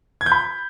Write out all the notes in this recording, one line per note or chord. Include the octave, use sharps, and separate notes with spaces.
G#6
G6
B5